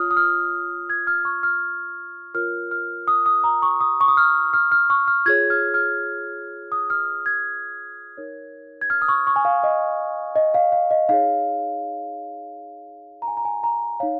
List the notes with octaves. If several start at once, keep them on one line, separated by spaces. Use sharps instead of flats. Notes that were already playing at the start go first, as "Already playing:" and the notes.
Already playing: F4 C#5 D#6 F6
D#6
F6
G#6
F6
C#6
F6
F4 A#4 C#5 F6
F6
D#6
D#6
A#5
C#6
D#6
C#6
D#6
F6
F6
F6
C#6
F6
F4 G#4 C#5 G#6
F6
F6
D#6
F6
G#6
D#4 A#4 C#5
G#6
F6
D#6
C#6
C#6
G#5
F5
D#5
D#5
F5
F5
D#5
D#4 G#4 C#5 F5
A#5
G#5
A#5
G#5
A#5
D#4 C#5 F5